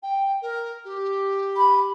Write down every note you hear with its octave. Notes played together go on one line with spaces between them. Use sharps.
G5
A#4
G4
B5